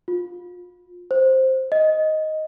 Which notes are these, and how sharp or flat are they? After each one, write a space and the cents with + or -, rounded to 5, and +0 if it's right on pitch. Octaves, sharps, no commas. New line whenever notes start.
F4 +25
C5 +5
D#5 +5